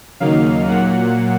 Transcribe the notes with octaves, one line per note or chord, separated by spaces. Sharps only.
D#2 C#3 F#3 A#3 D#4 F5
A#2 F#3 A#3 F#5